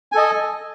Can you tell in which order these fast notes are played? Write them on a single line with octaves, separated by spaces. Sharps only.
G#5 A4 D#5